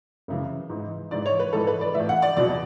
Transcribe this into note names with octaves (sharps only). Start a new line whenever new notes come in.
F#2 C#3 E3
G#2 E3
G#2 E3 D5
C#5
B4
G#2 E3 A4
B4
D5
A2 E3 E5
F#5
D5
E2 B2 F#3 D5